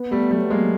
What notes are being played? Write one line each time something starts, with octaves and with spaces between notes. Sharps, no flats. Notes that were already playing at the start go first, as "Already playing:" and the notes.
Already playing: B3
G3 A3
F#3 G3 A3
G#3 A#3